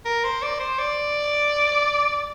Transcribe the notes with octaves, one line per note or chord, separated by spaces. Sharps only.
A#4
C5
D5
C5
D5